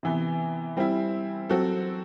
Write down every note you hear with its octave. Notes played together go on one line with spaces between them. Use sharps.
C3 E3 B3
G3 C4 E4
F#3 C4 F#4 A4